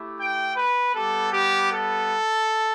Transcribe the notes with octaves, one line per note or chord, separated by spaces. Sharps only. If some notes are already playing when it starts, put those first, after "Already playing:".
Already playing: A3 E4 G4
G5
B4
G3 B3 G4 A4
G4
A4